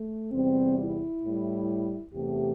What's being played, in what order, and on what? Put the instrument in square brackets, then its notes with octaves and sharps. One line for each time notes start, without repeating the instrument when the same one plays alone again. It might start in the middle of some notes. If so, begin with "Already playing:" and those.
Already playing: [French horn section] A3
E2 C3 G3 C4
E4
A2 G3
E2 C3 A3 G4